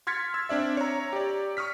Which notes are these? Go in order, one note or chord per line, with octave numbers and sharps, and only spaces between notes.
C6 F6 G#6 A6 B6 C#7
E6
C4 D4 D5 E5
C#5 A#5
G4 D5
C#6 D#6 F6 B6